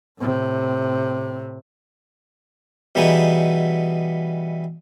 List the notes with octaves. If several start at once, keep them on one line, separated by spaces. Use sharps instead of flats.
A2 C3
B2 E3 G3 B3 D#4 G#4